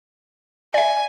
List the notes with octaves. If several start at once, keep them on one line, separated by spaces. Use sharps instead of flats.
D5 E5 G#5